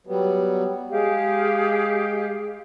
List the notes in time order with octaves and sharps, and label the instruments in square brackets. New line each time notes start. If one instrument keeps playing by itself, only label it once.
[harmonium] F#3 G3 B3
[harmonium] G#3 [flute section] G4 G#4 F5